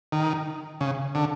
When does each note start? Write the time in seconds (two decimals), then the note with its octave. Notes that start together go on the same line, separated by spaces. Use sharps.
0.12 D#3
0.81 C#3
1.15 D3